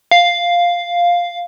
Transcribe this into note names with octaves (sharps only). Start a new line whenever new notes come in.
F5